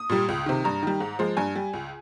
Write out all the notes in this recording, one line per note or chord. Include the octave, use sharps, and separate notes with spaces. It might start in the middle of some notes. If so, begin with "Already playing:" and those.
Already playing: D#6
A#2 G3
C#2
C3 D#3
G2 A#5
D#3 G3
G#2
F3 G#3
G2 G#5
G3
C#2